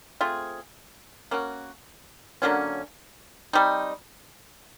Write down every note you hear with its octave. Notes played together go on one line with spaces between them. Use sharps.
A3 C4 F4 G#4
A#3 C#4 F#4
D3 F#3 A#3 C#4
G3 C4 D#4